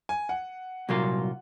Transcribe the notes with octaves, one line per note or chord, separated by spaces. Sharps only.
G#5
F#5
C2 A#2 F#3 A#3 F4